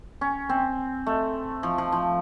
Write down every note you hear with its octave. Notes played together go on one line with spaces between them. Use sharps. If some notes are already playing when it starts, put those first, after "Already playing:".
C#4
C4
A3
F3
F3
F3